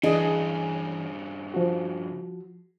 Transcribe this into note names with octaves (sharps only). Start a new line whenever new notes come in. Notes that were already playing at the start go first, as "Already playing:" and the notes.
G2 C#3 E3 D4 G#4 D#5
F3 F#4